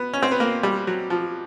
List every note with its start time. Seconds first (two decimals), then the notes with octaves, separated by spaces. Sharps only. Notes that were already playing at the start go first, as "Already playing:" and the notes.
Already playing: B3
0.13 C#4
0.23 C4
0.31 B3
0.40 A#3
0.63 G3
0.87 F#3
1.10 F3